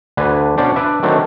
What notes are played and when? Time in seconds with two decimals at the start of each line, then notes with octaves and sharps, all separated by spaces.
0.17 D2 D3 D4 B4 G#5
0.58 B2 C#4 D4 C5 D5
0.76 D4 B4 D5 E5
1.03 D#3 F#3 A3 C4 D4 A#4